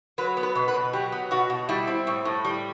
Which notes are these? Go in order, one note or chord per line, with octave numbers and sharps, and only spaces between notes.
F#3 B4
B3
B4
B2
B4
B2
F#3 G4
B3
B2 F#4
B2
G3 E4
C4
A2
A2
G3